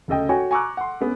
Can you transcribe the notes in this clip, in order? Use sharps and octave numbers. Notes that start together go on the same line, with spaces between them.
D2 C#3 A4 D#5 G5
F#4 C#5 G5 G#5
G#5 A#5 C#6 D6 E6 F#6
F#5 C6
B3 C#4